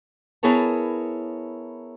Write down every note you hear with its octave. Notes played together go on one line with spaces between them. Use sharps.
B3 E4 G#4 A#4 C#5 A5